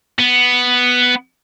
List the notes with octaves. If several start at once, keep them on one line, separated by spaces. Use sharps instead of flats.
B3